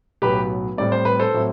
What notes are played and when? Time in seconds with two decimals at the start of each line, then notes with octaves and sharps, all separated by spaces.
0.22 B1 A2 F#3 B3 G4 B4
0.77 A2 G3 C4 D5
0.92 C5
1.05 B4
1.19 A4 C5
1.34 A2 F#3 C4 E4